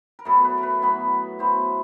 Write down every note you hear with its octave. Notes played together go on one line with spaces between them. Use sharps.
A#4
A2 F#3 B3 E4 A4
B4
A#4
B4
A2 F#3 B3 E4 B4
A2 F#3 B3 E4 C5